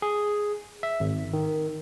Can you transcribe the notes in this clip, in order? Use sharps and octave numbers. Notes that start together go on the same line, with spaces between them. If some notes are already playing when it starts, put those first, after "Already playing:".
G#4
E5
G#1
D#3